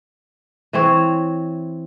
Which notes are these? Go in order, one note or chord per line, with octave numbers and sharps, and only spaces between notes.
E3 C4 C#5